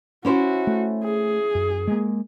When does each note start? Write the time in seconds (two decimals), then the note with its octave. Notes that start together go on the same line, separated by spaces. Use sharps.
0.25 C#4 E4 F#4 C5
0.67 A3
1.04 G#4
1.55 F#2
1.87 G#3 A#3